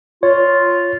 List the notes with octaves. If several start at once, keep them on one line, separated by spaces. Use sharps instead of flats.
F4 C#5